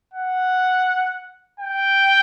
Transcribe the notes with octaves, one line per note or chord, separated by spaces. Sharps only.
F#5
G5